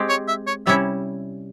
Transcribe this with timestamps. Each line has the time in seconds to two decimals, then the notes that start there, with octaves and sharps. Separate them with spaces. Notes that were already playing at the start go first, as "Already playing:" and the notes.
Already playing: G#3 C4 G4
0.09 C#5
0.28 E5
0.47 C#5
0.66 C3 G3 C#4 E4 E5